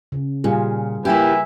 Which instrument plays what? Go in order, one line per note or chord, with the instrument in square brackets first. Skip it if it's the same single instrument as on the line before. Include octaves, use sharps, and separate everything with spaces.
[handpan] C#3
[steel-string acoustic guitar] A#2 [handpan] G3 F4 G#4
[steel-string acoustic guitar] A#3 E4 G4 [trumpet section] B4 E5 G#5